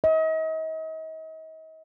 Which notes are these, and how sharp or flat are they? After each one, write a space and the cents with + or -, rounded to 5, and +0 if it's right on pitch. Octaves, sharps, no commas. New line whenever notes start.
D#5 +40